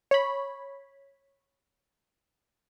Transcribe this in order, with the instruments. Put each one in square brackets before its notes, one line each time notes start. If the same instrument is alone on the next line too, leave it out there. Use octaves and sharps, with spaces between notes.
[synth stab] C#5 B5